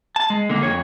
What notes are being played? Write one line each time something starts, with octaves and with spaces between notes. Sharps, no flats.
A5
G#3
D3 A#3
F2 C#5